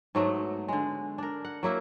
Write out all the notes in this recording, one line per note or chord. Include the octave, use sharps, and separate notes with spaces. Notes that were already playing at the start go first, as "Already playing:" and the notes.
G#2 F#3 A3 B3
D3 G#3
D4 A#4
F#5
F#3 A#3 E4 A#4